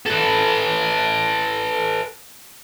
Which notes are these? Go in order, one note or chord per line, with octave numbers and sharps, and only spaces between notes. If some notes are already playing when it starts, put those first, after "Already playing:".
A4 B4